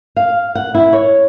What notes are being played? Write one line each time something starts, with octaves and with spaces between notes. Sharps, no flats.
F5
F#5
E4
C#5